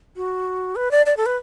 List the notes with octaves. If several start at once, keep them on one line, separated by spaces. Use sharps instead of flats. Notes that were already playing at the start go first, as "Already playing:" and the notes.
F#4
B4
D5
D5
A4
B4